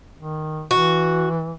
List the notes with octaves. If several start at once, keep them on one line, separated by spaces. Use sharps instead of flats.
D#3
E3 F#4